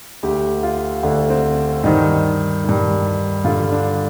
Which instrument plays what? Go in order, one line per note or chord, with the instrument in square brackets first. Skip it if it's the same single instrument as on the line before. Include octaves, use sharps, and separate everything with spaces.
[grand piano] D2 D3 G4
F4
D2 D3 D4
C4
G2 D#3 D#4
G2 D#3
G2 D3 F4
D4